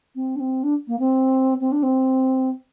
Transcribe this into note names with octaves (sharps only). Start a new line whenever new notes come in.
C4
D4
C4
D4
A#3
C4
C4
D4
C4